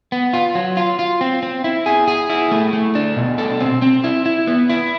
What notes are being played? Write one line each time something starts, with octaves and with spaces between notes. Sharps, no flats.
B3
F4
F#3
F4
F4
C4
C4
E4
G#4
G#4
E4
A3
A3
D4
B2
A4
C4
C4
E4
E4
B3
E4